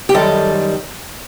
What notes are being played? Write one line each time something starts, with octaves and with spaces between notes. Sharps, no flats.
G4
F#2 D#3 G3 A4